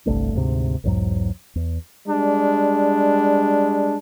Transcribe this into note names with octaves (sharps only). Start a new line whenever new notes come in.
G1 C2 A3 D4
D2 G#2 C3
B1 E2 G#2 F#3
E2
G3 G#3 D4